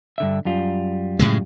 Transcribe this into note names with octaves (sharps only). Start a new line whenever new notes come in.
G2 D3 E5
F#2 G3 F4
A2 C#3 G#3